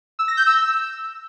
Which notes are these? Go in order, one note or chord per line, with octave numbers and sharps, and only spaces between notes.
E6
A#6
G6
E6